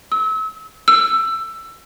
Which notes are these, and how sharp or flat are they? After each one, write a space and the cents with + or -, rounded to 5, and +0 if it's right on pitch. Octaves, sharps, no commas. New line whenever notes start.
E6 -35
E6 +15